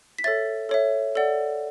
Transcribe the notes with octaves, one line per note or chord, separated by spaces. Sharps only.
B6
A4 C#5 E5 A6
A4 C#5 E5
A4 D5 F#5